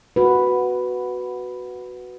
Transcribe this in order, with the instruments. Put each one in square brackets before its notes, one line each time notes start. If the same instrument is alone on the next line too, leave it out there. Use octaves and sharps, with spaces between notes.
[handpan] F#4 B4